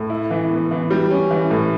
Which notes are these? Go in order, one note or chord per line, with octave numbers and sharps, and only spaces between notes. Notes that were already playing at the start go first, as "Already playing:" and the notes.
Already playing: A2
E4
E3
B3
E3
G3
C#4
E3
A2